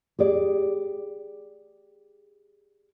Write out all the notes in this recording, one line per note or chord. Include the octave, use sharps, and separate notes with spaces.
G4 G#4 D5